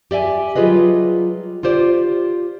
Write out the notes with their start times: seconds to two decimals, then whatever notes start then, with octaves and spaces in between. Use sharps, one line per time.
0.11 G4 D5 E5 G#5
0.56 F#3 G3 F4 G#4 B4 D#5
1.63 F4 G4 C5 D5